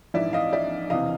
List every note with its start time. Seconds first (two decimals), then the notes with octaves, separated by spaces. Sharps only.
0.14 A#1 G#2 E3 D5 E5
0.33 D#5 F5
0.52 D5 E5
0.90 E1 C3 E3 D#5 F5